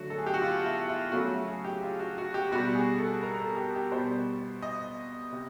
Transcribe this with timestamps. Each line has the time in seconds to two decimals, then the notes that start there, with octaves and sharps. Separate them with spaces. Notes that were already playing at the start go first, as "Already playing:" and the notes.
Already playing: D3 F#3 A3 F#4
0.10 A4
0.18 G#4
0.26 G4
0.34 F#4
0.42 F4
0.66 E4
0.89 F4
1.12 C#3 F#3 A3 F#4
1.48 G#4
1.64 G4
1.83 F4
1.99 F#4
2.18 F#4
2.34 G4
2.52 B2 F#4
2.55 G3
2.75 G#4
2.99 A4
3.23 A#4
3.40 A4
3.57 G4
3.75 G4
3.92 B2 G3 C5
4.62 D#5
5.33 C3